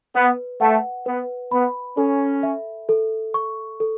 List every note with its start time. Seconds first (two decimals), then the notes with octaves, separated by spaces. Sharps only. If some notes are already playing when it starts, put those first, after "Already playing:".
0.15 B3 B4
0.61 A3 F#5
1.06 B3 B4
1.51 B3 B5
1.97 C#4 A4
2.43 E5
2.89 A4
3.34 C#6
3.80 A4